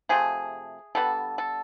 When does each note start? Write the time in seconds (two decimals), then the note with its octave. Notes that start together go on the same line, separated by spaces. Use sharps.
0.09 C3 F3 A3 G#4
0.95 D3 G3 B3 A4
1.38 A4